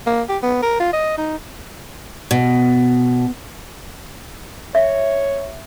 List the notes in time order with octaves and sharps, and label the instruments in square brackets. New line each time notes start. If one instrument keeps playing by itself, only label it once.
[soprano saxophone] A#3
G4
B3
A#4
F4
D#5
D#4
[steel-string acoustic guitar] B2
[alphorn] C#5 [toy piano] E5